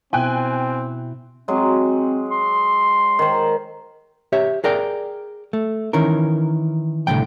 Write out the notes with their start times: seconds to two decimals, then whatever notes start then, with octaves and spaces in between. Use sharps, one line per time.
0.13 B2 C4 E4 G5 G#5 F#6
1.48 F#3 G#3 C4
2.30 C6
3.19 D#3 C5
4.33 G4 C#5 E5
4.64 G#4 A#4 D5 G5
5.53 A3
5.93 D#3 E3 C#4 A#4
7.07 C2 A2 D3 E3 G5